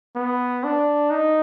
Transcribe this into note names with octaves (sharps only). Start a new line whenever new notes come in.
B3
D4
D#4